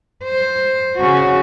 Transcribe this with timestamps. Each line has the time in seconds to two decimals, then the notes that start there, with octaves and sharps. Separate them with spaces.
0.25 C5
0.96 C#3 F#4